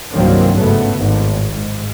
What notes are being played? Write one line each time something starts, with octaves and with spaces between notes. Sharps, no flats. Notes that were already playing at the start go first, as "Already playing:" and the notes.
C2 G2 D#3 F#3 A#3 C4
G#1 C#3 A3 B3
G#1 A2
G#2